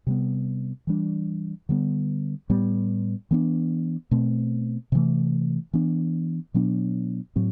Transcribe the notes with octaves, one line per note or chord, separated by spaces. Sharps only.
C3 G3 B3
E3 G3 D4
D3 G3 B3
A2 G3 B3
E3 B3 D4
B2 A3 C4
C3 E3 A3
E3 B3 D4
B2 F#3 B3 D4
A2 F#3 C4